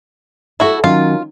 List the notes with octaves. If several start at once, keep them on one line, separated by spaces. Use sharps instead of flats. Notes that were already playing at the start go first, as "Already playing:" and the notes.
E4 F#4 A4 D5 E5
D#3 F#3 C#4 F4